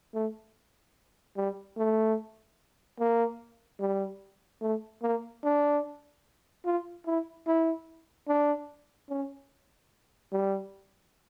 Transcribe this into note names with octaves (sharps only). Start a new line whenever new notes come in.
A3
G3
A3
A#3
G3
A3
A#3
D4
F4
E4
E4
D4
C#4
G3